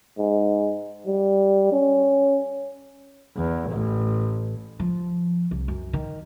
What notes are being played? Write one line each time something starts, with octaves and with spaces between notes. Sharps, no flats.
G#2
G3
C#4
E2
A1
F3
C2
F#2
D#3